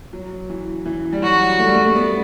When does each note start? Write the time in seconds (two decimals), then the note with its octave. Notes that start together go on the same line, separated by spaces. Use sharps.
0.13 F#3
0.50 E3
0.86 E3
1.13 G3
1.22 F#3 F#4
1.59 A3
1.67 G3
1.74 A3
1.86 A3
1.96 B3